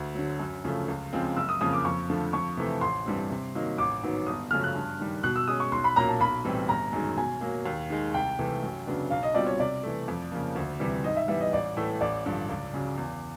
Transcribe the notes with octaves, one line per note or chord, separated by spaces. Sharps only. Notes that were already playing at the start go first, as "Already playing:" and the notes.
Already playing: D2
D3 F#3
F#2
C#3 F3 A3
C#2
C#3 F3 G#3 C4
F#1 E6
D#6
F2 C#3 F3 A#3 D#6
D6
F2 C#6
D3 F3 A3
F2 C#6
C3 E3 A3
A1 C6
G2 E3 G3 C4
C3
D#3 F#3 A#3 D#4
A1 D6
G#2 D#3 F#3 B3
G1 D#6
F#2 C#3 F3 A3 F6
F#6
G2
D#3 G3
B2 F#6
E6
G#3 C#4 D#6
C#6
B1 C6
B5
A#2 F#3 A#3 C#4 A#5
A5
B1 B5
A2 E3 G3 C4
G1 A#5
F#2 D#3 G#3
B2 G#5
F#3 A#3
D#2
D#3 G#3
C2 G5
C3 E3 A3
F#2
C#3 F#3 B3 D4
B1 F5
D#5
B2 G3 C4 F4 D5
C#5
C3 D5
E3 A3
F2
C#3 F3 A#3
D2
C3 E3 G3
G#2 D#5
E5
E3 G3 B3 E5
D#5
A1 D5
A2 E3 A3
A1 D5
G2 D3 F3
C#2
C#3 F#3
E2